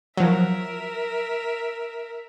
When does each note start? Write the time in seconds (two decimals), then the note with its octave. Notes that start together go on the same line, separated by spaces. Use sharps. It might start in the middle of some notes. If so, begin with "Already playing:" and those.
0.17 F3 F#3 A#4 E5